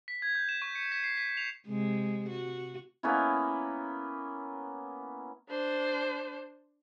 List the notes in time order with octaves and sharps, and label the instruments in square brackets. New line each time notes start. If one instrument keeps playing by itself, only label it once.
[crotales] B6
G#6
G6
E7
C#6
C#7
B6
C7
B6
F7
[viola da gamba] C3 G#3
F#4
[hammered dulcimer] A#3 B3 C#4 E4
[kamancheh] D4 C5